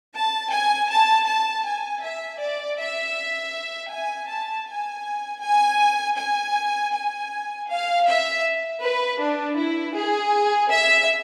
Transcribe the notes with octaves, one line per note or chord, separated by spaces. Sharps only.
A5
G#5
A5
A5
G#5
E5
D5
E5
G#5
A5
G#5
G#5
G#5
G#5
F5
E5
B4
D4
E4
G#4
E5